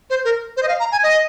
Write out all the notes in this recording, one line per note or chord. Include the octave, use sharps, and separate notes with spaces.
C5
A#4
C5
D#5
F5
A#5
G#5
D#5